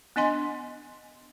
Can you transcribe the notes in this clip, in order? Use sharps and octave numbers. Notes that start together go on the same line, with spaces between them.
B3 D4 D#5 G#5 C6